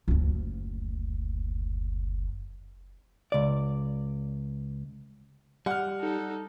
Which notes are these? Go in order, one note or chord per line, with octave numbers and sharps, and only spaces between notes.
F#1 D2
C#2 D5
G3 F#5 F6
D#4 A4